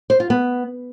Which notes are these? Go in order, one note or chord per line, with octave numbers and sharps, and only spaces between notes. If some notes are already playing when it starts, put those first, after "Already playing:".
C5
F4
B3